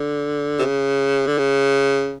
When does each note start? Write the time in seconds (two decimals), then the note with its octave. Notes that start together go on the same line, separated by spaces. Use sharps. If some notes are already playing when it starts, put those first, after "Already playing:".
Already playing: D3
0.59 C3
0.62 C#3
1.27 D3
1.38 C#3